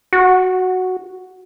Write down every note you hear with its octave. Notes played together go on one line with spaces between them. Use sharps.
F#4